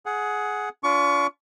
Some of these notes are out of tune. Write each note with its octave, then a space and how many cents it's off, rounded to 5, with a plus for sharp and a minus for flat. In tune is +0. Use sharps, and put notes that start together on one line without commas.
G#4 +15 F#5 +0
D4 -45 F4 +0 C#6 +25